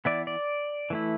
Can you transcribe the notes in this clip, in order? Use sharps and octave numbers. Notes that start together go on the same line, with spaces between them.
E3 B3 E4 D5
D5
E3 A3 E4